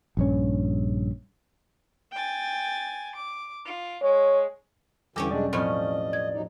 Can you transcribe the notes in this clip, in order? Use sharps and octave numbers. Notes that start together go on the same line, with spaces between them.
A#1 G2 C#4
G5 G#5 A6
D6
F4
G#3 C#5
E2 D3 E3 G3 C#4 G4 A4 D6
B2 F#3 G#3 D4 D5
A2 F3 F#3 C4 C#4 D#5
G#6
F#3 D#4